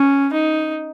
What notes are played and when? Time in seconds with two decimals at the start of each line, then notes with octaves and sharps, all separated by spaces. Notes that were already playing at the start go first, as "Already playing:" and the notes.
Already playing: C#4
0.33 D#4